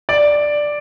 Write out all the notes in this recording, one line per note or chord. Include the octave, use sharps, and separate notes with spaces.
D5